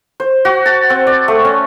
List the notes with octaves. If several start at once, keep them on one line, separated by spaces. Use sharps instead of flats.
C5
F#4
A5
C4
D5
A3
C#4